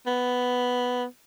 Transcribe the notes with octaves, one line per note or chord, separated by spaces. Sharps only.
B3